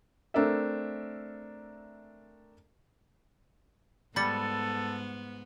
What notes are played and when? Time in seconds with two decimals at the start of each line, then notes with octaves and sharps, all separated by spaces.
0.34 A3 C4 D4 A#4 D5 E5
4.16 G#2 G3 B3 A4 B5 A6 C#7